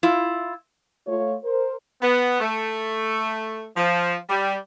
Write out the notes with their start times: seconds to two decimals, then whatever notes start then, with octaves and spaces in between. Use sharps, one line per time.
0.03 E4 F4
1.07 A3 F4 C#5
1.44 A#4 C5
2.01 B3
2.40 A3
3.76 F3
4.29 G3